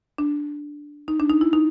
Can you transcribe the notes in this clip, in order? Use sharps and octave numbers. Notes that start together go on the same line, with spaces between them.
D4
D#4
D4
D#4
E4
D#4